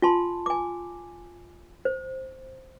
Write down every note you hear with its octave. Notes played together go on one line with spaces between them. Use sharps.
F4 G#5 A5 C6
G#5 D6
C5